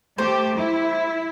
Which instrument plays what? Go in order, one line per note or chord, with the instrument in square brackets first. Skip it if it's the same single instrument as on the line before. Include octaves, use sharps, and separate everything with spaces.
[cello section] A3 G4 [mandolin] C5
[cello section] E4